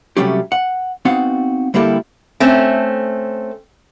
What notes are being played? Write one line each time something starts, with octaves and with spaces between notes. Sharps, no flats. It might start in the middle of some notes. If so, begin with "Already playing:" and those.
C3 F#3 G3 A3 C#4 G4
F#5
B3 C4 D#4 F#4 F5 F#5
D3 G3 A#3 E4 G4 A4
A3 C4 C#4